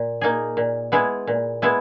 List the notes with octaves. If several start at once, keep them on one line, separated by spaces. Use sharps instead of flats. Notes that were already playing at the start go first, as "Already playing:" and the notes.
Already playing: A#2
A#3 D#4 G#4
A#2
G#3 B3 E4 G#4
A#2
G#3 B3 E4 G#4